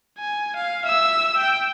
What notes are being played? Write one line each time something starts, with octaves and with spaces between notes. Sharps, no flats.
G#5
F5
E5 E6
G5